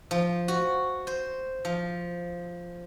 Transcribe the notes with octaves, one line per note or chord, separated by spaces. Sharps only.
F3
F#4
C5
F3